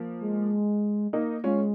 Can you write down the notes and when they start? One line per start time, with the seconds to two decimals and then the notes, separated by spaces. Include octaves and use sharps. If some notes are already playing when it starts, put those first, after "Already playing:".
Already playing: F3 A#3
0.21 G#3
1.13 A#3 D#4
1.44 G#3 C#4 F4